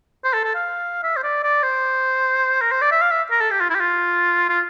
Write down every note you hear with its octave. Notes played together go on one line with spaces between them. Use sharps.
C5
A4
A4
F5
E5
C5
D5
D5
C5
A#4
C5
D5
E5
F5
E5
A#4
A4
G4
F4
E4
G4
F4
F4